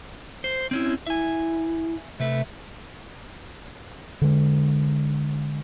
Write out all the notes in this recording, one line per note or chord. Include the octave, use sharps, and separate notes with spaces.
C5
C4 C#4 E4
E4 E5 G#5
C3 A3 B4 E5
D3 G#3